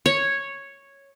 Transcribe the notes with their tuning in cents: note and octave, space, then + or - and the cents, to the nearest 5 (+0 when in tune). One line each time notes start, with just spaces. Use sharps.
C#5 -5